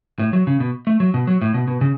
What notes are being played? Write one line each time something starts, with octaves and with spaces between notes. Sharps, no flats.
A2
F#3
C#3
B2
A3
F#3
B2
F#3
A2
B2
B2
C#3